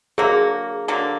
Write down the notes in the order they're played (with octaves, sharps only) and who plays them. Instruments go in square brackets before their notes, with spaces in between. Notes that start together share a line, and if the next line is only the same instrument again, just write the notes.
[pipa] D3 F#3 A#3 [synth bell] G#4
[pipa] D3 F#3 A#3